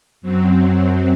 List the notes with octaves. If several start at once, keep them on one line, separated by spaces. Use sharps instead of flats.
F#2 F#3 C4